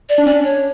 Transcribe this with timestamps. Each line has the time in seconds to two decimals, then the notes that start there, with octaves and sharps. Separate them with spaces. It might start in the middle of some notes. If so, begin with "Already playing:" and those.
0.09 D5
0.18 D4
0.26 C#4 D5
0.34 D4
0.44 C#5